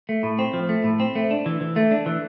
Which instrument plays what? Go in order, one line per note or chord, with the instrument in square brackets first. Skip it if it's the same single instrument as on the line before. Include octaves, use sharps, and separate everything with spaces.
[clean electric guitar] A3
A2
C4
F3
A3
A2
C4
A3
D4
E3
E3
A3
D4
E3